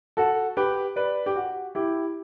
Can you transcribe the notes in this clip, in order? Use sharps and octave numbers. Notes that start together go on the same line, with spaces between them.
F#4 A4
G4 B4
B4 D5
G4
F#4
E4 G4